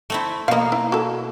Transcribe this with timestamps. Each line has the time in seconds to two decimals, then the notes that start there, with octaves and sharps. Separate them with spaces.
0.10 A3 C4 E4
0.48 B2 A#3 D#5 F5
0.72 E4
0.92 F#4 A4